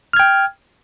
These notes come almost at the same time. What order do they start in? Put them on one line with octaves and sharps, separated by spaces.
F6 G#6 G5